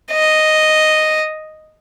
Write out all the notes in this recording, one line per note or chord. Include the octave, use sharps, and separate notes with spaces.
D#5